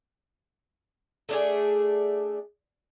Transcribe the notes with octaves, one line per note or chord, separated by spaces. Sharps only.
A3 D4 G#4